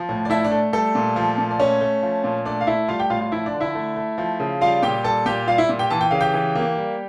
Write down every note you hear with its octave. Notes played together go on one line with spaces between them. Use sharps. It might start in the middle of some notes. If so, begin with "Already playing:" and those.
Already playing: F3
A2
D5
A3 E4 E5
D4 D5
A3
G3 A3 A4
A#2
F3
A#2
D5
A3 C#4 C#5
A3
F3
A#2
A3 D4 D5
F5
A3 E4 E5
G3 F4 F5
G4 G5
A2 F4 F5
F4 F5
F3 E4 E5
D4 D5
D3
E4 E5
A3
A3
F3
C#3
G3 F4 F5
A#2 G4 G5
G3 A4 A5
A#2 G4 G5
G3 F4 F5
E4 E5
A#2
G4 G5
E3 A5
G5
C#3 F5
G4 G5
E3
A#3
G3